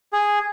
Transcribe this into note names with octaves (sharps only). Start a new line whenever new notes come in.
G#4